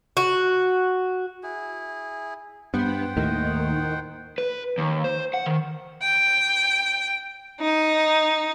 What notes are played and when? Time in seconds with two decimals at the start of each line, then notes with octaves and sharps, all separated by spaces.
0.17 F#4
1.43 E4 G#4
2.74 G2 B3 C5 F#5 G5
3.17 D#2 A2 D#3
4.38 B4
4.78 D#2
5.04 C5
5.34 F#5
5.46 D#3
6.03 G5
7.61 D#4